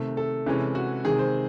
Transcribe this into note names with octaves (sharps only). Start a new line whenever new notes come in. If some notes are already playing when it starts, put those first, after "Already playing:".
Already playing: C3 D#3 A3
A4
C3 E3 G#3 C#4
F#4
C3 D#3 G#3 G#4
C5